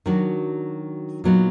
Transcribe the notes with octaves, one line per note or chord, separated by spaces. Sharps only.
D#3 F#3 D4 F#4
A#2 F#3 B3 D#4